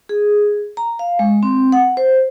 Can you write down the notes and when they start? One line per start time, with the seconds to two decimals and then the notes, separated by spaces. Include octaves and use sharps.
0.09 G#4
0.77 A#5
0.99 F5
1.19 G#3
1.43 C4
1.72 F#5
1.97 C5